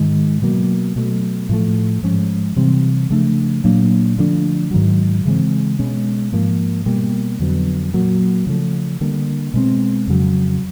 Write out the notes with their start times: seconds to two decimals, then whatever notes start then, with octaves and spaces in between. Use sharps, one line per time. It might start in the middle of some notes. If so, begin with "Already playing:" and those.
Already playing: G#2 D#3 G#3
0.42 B2 F#3 A#3
0.96 B2 F#3 A3
1.49 A2 F3 A3
2.03 G#2 F3 G#3 C#4
2.56 C3 E3 G3 C4
3.10 C#3 F3 A3 D4
3.64 A#2 F#3 A#3 D4
4.18 D3 F3 A3 D4
4.71 G#2 D#3 F#3
5.25 C#3 E3 G#3 C4
5.79 B2 G#3 C#4
6.33 G#2 F3 A#3
6.86 B2 G3 A#3
7.40 F2 D3 F#3 B3
7.93 A#2 F#3 A#3
8.47 C#3 F3 A3
9.01 D3 G3 A#3
9.54 B2 G#3 C4
10.07 F2 C#3 F#3